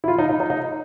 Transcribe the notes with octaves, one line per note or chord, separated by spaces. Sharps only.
E4
F4
D#4
D#4
D#4
D#4